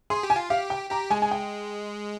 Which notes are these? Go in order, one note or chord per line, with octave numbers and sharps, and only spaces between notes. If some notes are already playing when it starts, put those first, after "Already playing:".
G#4 C6
G4
G#5
F4
G4 F5
G5
G4 A#5
G#3 G#5
G#5
G5